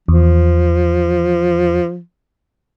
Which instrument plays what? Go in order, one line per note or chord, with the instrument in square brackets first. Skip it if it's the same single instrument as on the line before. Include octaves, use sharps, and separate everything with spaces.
[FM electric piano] E2 [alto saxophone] F3